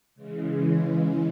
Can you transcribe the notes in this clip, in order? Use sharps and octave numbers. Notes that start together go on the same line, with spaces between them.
C#3 E3 G#3